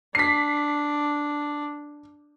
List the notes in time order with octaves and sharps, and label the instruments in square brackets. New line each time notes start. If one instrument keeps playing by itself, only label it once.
[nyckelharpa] D4 [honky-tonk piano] B6 C7